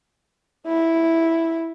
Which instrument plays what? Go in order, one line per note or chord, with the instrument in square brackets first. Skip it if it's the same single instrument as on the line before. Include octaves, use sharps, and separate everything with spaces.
[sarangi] E4